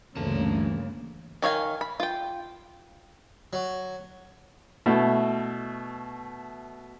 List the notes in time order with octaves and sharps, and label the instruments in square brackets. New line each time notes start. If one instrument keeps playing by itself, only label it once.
[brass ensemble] D2 [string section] G2 C#3 [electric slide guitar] E3 A5 [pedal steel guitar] A#3
[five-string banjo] D#3 C#5 F5 G#5
B5
F4 G5
[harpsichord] F#3
[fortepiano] B2 A3 E4